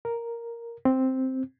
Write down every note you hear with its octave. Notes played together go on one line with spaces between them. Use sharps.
A#4
C4